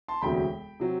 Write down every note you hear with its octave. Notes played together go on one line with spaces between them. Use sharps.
A5 C6
E1 D2 C3 F#3 G5 B5
C3 F#3